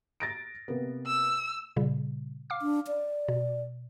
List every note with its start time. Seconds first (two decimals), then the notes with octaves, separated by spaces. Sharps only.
0.20 A6 A#6 D7
0.68 C3 A#3 B3
1.06 E6
1.76 A#2 C#3 G3
2.50 F5 D6 F6
2.62 D4
2.87 D5
3.28 B2